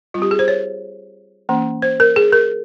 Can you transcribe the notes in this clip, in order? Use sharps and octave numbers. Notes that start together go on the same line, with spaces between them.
G3 C4 F4 G4
G#4
C5
C#5
E3 A#3 C#4
C5
A#4
G#4
A#4